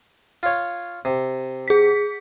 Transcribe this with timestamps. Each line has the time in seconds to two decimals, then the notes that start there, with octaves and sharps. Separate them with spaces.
0.43 F4 C#5
1.05 C3
1.68 G#4 B6